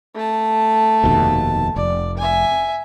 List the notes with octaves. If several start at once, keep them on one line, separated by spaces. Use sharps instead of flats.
A3 A5
F1 D#2 B2
F1 D5
E5 G#5